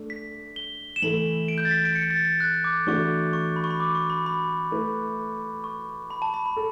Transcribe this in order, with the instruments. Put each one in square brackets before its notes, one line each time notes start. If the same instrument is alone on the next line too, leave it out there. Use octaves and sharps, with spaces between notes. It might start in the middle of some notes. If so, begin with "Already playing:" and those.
Already playing: [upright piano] A3 D4
[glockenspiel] B6
G7
E7
[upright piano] E3 A3 E4 A4 [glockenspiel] F#7
[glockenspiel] D7
G6
A6
B6
D7
C#7
A6
A6
F#6
D6
[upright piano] E3 A3 D4 F#4 [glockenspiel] C#6
[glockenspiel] C#6
B5
C#6
B5
D6
C#6
B5
B5
[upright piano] A3 E4 B4
[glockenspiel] C#6
B5
A5
B5
B5
[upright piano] A4